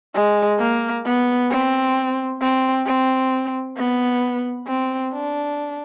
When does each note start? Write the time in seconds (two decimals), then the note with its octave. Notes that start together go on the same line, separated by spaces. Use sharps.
0.15 G#3
0.59 A#3
1.05 B3
1.50 C4
2.41 C4
2.86 C4
3.77 B3
4.67 C4
5.13 D4